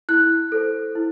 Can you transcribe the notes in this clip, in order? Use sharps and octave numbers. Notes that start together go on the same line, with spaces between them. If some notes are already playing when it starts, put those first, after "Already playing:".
E4 F#6
A4 C5
E4